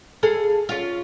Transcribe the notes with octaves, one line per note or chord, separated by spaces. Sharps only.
G#4 A4 F5
C#4 F4